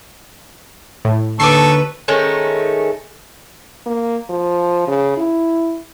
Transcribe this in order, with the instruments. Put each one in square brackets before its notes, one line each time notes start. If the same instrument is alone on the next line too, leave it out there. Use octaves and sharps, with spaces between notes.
[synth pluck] A2
[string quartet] D#2 B4 [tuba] D3 [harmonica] A4 C#6 [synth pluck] D6 C7
[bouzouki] D#3 G#3 A3 C#4
[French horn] A#3
F3
C#3
E4